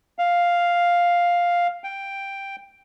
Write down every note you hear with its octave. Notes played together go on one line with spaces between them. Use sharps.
F5
G5